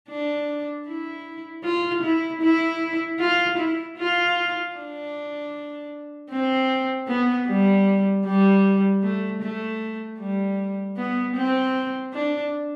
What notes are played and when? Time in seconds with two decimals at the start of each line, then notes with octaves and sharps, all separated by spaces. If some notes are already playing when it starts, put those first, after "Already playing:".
0.09 D4
0.87 E4
1.64 F4
2.03 E4
2.42 E4
3.19 F4
3.58 E4
3.98 F4
4.76 D4
6.31 C4
7.08 B3
7.47 G3
8.25 G3
9.02 A3
9.42 A3
10.19 G3
10.97 B3
11.36 C4
12.13 D4